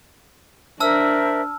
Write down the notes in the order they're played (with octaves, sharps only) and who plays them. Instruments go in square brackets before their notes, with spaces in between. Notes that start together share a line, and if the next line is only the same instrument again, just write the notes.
[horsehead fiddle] D4 [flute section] A#4 C5 E5 [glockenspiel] A5 E6 F6